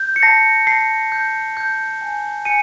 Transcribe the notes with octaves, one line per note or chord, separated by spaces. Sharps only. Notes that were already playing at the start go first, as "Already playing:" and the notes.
Already playing: G6
C#7
A5 A#6 C7
A5 A#6 C7
G6
G6
G#5
G#5 C#7 D#7